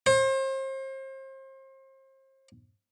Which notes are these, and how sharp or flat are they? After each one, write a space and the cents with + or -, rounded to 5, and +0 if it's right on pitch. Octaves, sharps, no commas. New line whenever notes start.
C5 +35